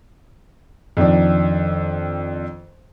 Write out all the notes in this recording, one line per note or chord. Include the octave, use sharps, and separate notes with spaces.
F2 D#3 D4